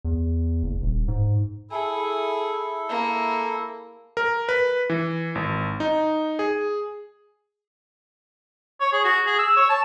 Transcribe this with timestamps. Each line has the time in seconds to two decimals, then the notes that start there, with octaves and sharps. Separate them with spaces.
0.05 E2
0.63 F#1
0.82 D#1
1.08 G#2
1.71 E4 G#4 A4
2.89 A#3
4.17 A#4
4.49 B4
4.90 E3
5.35 G#1
5.80 D#4
6.39 G#4
8.80 C#5
8.93 G#4
9.04 F#4
9.26 G#4
9.39 E6
9.56 C#5
9.70 A5